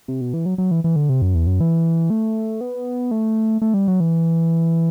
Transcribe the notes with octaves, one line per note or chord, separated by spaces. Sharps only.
C3
B2
E3
F#3
F#3
E3
E3
D3
C3
F#2
E2
F#2
E3
A3
B3
A3
A3
G3
F#3
E3